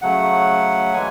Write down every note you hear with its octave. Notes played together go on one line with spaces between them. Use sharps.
C#3 F#3 A3 F#5
E3 G#3 G#5